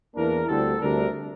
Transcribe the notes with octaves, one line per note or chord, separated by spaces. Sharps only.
E2 E3 A#3 D4 A#4
D2 D3 G3 C4 A4
D2 C3 G3 D4 A#4